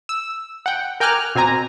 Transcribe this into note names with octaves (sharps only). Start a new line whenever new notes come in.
E6
F#5 G5
A#4 G5 G#5 D6 F6 F#6
B2 C4 G#5 A#5